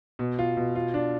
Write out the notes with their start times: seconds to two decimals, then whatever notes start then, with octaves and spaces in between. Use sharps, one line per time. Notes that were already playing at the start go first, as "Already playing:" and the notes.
0.19 B2
0.39 F4
0.57 B2
0.75 F4
0.94 D4